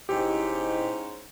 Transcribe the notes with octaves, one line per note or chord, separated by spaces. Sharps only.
D#1 G#2 C#4 E4 G4 C5 D#5